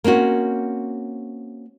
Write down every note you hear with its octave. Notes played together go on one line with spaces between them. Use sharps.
A#3 C4 C#4 F#4